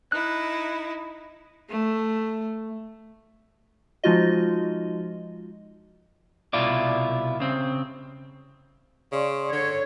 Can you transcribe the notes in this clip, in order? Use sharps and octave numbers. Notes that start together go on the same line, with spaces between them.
D#4 E4 F#6
A3
F3 G#3 D#4 F4 F#4 D#5
C2 B2 E4 F4 D5
C#3 C4
C#3 D5 C6 C#6
D3 C#5